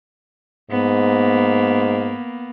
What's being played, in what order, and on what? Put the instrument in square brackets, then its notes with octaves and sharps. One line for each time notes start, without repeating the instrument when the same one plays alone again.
[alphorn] G#2 [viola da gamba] A#3 B3